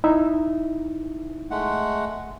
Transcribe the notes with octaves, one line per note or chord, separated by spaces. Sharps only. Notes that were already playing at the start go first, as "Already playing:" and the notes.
D#4 E4 E5
G#3 A3 F#5